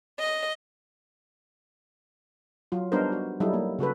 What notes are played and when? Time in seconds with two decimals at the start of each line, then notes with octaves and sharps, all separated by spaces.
0.20 D#5
2.72 F#3 F4
2.92 G3 B3 D4 D#4 A#4 C5
3.12 F#4
3.40 F#3 G3 D#4 E4 A4
3.53 A#3
3.79 C#3 F#4 A4 B4